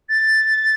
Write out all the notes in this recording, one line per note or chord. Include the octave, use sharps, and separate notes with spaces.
A6